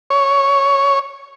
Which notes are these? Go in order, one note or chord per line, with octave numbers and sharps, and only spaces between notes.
C#5